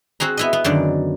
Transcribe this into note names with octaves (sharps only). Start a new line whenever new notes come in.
C4 F#4 G#4 A#5
B3 E4 D#5
B3
F#2 D3 D#3 D5